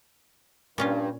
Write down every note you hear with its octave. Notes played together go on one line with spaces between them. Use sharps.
G2 A#2 C#4 F4